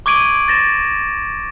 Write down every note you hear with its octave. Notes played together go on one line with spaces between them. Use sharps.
C#6 D6 G#6 D7 D#7 F#7
C#6 A6 A#6 E7